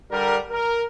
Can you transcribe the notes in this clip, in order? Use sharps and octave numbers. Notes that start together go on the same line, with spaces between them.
D3 G3 A#4
A#4